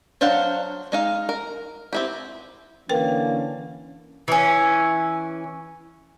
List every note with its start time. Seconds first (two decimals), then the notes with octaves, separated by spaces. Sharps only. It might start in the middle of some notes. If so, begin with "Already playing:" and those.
0.21 F#3 D4 C5 F5 F#5
0.92 G#3 D#4 F5
1.29 A#4
1.93 C4 E4 G4
2.89 D3 E3 A#3 C#4 A#4 B4 G5
4.28 E3 C#4